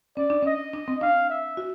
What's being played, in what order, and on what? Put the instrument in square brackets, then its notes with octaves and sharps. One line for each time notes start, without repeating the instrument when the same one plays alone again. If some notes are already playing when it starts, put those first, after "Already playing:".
[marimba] C#4 [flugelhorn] D5
[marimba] D4
[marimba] C#4 [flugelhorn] D#5
[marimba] D4
C4
[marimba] D4 [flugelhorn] F5
[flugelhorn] E5
[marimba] F#4